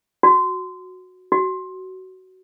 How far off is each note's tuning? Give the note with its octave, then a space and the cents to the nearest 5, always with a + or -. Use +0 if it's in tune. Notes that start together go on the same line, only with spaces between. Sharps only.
F#4 -10
F#4 +20